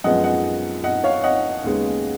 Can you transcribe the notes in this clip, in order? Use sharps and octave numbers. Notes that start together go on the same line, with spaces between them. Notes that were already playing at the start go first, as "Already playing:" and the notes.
F#2 F3 G#3 B3 D#5 F#5
D#5 F#5
D#5 F#5
C#5 F5
D#5 F#5
D#2 C#3 G#3 B3